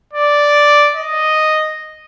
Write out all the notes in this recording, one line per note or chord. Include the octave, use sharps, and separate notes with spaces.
D5
D#5